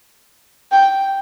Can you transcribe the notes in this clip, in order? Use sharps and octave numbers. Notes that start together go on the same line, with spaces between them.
G5